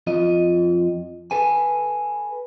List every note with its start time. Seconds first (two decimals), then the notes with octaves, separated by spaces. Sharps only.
0.07 F2 F4 D#5
1.31 A4 B4 G#5